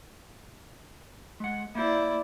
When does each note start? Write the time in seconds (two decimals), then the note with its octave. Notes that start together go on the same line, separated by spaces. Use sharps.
1.40 G#3 F#5
1.75 A#3 E4 C5 D5